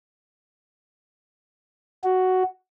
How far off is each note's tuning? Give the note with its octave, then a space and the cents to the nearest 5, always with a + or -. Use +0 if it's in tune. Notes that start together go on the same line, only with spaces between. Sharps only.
F#4 +5